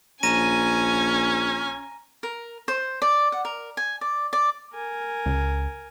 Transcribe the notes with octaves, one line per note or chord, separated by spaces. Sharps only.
A#1 C#4 G#5 A#5 A#6 D#7
A#4
C5
D5
F#5
A#4
G#5
D5
D5
A#4 G#5
C#2